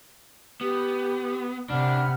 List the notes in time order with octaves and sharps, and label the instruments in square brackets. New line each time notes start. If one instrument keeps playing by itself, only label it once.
[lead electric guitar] B3 [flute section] G4
[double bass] C3 [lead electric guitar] D4 [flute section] F#5 B5 F6